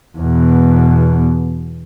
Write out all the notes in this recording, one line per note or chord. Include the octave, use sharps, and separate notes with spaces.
E2 B2